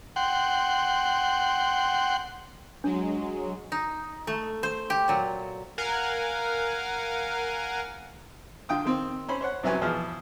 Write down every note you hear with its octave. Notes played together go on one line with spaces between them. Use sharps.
F#5 G5 C6
F#3 G#3 D4
D#4
A3
C5
G4
A#2 F#3
A#4 F5 F#5 G#5
D3 F4 G5 D#6
D#3 C4
C#4 C5 B5
C5 C#5 F#5
C2 C3 F#3 C#4 B4 G#5
E2 B2 F3 G#4 F6